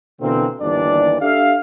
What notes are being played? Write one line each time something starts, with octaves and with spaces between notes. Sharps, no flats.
B2 D3 E3 A#3 C4
G1 D#2 E3 D4 D5
D4 G4 A4 E5 F5